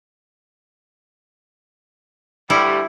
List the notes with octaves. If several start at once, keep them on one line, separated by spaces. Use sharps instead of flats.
D2 G3 E4